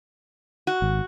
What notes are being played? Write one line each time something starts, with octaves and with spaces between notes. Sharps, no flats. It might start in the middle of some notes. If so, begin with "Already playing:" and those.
F#4
G#1